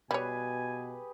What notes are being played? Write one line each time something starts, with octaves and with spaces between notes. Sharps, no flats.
B2 G3 G4 G#4 B4 C#5 G#5